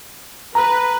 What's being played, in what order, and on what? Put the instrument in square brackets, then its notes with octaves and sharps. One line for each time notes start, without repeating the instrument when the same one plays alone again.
[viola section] B4 [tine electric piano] A#5